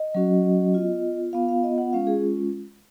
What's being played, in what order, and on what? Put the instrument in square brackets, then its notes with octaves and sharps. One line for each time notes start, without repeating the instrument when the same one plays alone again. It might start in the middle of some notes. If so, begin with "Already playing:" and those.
Already playing: [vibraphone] D#5
F#3 C#4 F#4
B3 F4
B3 F4 F5
F5
D#5
F#5
G#3 C#4 F4 F5
G#4